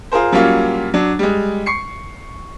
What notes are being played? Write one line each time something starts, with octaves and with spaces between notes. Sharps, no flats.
F4 G#4 A#4 C5
F#3 G3 A#3 C#4 F4
F#3 D4
G3 G#3
C#6 C7 C#7